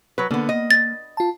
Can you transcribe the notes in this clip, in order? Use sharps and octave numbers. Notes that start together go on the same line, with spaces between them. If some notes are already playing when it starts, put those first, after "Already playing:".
F#3 B4
D3 A#3 B3
D#5
A6
F4 A5